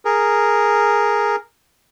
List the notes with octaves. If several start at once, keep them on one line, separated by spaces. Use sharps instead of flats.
G#4 A#4